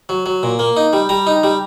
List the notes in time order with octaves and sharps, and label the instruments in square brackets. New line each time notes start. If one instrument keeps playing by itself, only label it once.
[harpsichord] F#3
F#3
A#2
A#3
D#4
G3
G3 A#5
D#4
G3